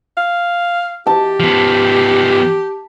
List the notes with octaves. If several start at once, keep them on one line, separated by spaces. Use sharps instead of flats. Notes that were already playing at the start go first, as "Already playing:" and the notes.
F5
G4 A5
F3 B3